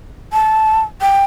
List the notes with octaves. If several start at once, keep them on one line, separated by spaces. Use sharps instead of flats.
A5
G5